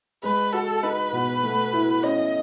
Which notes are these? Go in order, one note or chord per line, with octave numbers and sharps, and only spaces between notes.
G#3 B4
F#4 A4
D#4 B4
B2
A3
E4
C#4 D#5